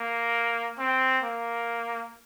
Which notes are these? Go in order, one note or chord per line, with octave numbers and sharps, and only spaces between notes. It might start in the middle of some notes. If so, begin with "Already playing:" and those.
Already playing: A#3
C4
A#3